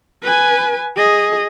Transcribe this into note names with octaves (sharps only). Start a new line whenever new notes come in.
B4 G#5
G#4 D#5